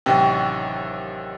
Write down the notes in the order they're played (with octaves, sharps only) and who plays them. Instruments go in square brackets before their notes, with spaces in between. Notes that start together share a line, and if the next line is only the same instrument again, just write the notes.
[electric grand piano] A1 C3 [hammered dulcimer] D#3 F#3 [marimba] G5